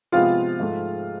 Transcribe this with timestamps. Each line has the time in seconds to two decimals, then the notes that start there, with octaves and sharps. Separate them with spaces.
0.12 C3 F3 G#3 B3 F4 F5
0.60 G#2 F3 A3